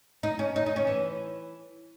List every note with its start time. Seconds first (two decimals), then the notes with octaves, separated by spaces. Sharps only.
0.23 D#4
0.39 C#4
0.56 D#4
0.66 D#4
0.76 C#4
0.87 E3